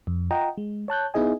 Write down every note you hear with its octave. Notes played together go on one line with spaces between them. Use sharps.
F2
F4 D#5 F#5 G5 A#5
G#3
C#5 A5 F#6 G6
B3 D#4 E4 G#4 D#5 G#5